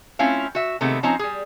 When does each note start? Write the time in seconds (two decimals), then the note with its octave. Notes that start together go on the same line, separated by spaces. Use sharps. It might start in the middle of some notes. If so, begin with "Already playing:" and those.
0.19 A3 C4 C#4 E4 F4 F5
0.55 F#4 E5
0.81 C3 D#3 G#3 A3 B3
1.03 F3 C4 C#4 D#4 A#5
1.19 G3 G#4